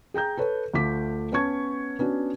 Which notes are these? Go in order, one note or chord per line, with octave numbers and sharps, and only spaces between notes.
G#4 G5 A#5 G6
A4 B4 C#5
D2 A3 F4 D6 B6
B3 C#4 C#5 A5 C#6 G#6
B3 C#4 D4 F#4